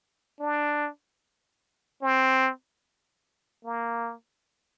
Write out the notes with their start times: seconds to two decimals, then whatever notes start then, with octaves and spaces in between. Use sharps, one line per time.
0.40 D4
2.02 C4
3.65 A#3